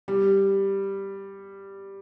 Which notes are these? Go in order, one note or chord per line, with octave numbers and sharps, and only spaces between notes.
G3